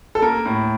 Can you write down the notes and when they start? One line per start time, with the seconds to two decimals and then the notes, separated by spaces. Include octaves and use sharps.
0.15 A4
0.22 A#3 A#4
0.45 A2